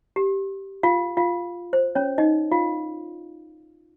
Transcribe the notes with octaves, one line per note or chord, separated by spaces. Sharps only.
G4
F4 F5
F4 F5
C5
C#4 C#5
D#4 D#5
F4 F5